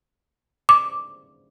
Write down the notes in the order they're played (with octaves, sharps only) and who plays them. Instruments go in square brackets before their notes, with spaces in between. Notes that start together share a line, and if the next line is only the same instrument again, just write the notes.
[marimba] D6